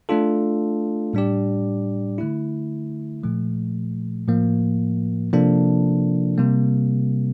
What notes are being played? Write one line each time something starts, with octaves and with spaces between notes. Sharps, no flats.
A3 D4 F4 A4
A2 G3 D4 G4 D5
D3 A3 E4
A#2 F3 A3
A2 F3 A#3
C3 F3 A#3 D4 A4
C3 G3 A#3